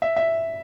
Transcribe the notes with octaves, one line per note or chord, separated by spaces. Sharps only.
E5
E5